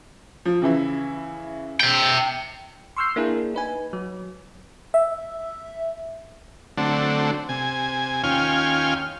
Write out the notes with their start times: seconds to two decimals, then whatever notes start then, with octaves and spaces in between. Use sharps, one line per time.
0.46 F3
0.62 C#3 E3 E4
1.80 E5 G5
2.97 C6 C#6 E6 F6 G6 C7
3.16 A#3 D4 E4 G#4 A#4
3.54 D#4 B4 G#5
3.93 F#3
4.94 E5
6.77 D3 F#3 A3 C4 D4
7.49 C3 G#5
8.23 D#2 C#4 F4 G5 G#5 F6